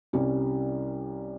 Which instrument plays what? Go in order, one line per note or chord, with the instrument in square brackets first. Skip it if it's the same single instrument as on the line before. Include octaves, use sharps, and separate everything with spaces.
[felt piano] C2 C3 G3 C#4